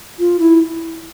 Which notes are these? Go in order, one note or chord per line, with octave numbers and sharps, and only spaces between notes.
F4
E4